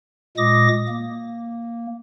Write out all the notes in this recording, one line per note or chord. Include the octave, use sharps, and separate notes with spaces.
A#2 G#3 D6 D#6 A#6
A#3